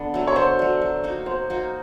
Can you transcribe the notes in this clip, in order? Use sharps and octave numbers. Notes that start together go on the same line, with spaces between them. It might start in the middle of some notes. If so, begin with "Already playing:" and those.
Already playing: D3 B3 D4
F#3 A3
C#5
D3 C5
F#3 A3
F#3
A#3 D#4 F#4
F#3 C5
A#3 D#4 F#4